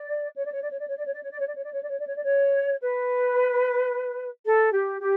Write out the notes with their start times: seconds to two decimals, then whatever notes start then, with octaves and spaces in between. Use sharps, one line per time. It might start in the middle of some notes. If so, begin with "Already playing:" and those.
Already playing: D5
0.35 C#5
0.45 D5
0.52 C#5
0.62 D5
0.70 C#5
0.78 D5
0.87 C#5
0.95 D5
1.04 C#5
1.13 D5
1.22 C#5
1.30 D5
1.38 C#5
1.47 D5
1.56 C#5
1.64 D5
1.72 C#5
1.81 D5
1.89 C#5
1.98 D5
2.07 C#5
2.15 D5
2.23 C#5
2.81 B4
4.45 A4
4.72 G4
4.99 G4